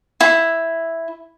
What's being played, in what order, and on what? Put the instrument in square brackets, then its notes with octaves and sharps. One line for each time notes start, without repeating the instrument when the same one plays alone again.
[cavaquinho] E4